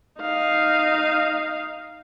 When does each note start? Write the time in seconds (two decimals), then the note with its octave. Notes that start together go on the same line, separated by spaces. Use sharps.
0.20 D#4 F5